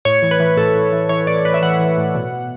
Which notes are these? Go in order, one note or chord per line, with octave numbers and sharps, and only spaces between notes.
A2 C#5
E3
B4
E3
A2 A4
A2
E3
E3 C#5
A2 D5
A2 B4
E5
E3 F#5
E3
A2
B2
B2